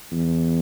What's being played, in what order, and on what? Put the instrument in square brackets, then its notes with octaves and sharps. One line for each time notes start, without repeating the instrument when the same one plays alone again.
[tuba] E2